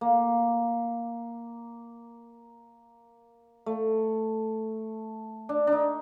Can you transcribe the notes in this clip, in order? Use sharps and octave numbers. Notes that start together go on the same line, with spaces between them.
A#3
A3
D4
D4 D#4